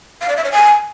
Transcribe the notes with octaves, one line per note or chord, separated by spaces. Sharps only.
F5
D5
E5
C#5
G#5